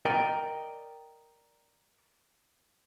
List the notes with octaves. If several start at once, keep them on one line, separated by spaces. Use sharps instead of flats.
A#4 D5 D#5 G5